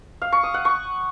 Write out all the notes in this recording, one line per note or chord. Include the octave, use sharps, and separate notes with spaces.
F5
C#6
D#6
F#5
C#6